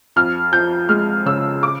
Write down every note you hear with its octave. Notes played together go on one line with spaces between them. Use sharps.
F2 F6
F3 G6
G#3 F6
C#3 E6
D6